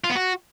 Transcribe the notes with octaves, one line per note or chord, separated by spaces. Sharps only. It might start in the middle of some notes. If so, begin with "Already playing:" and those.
F4
B3
F#4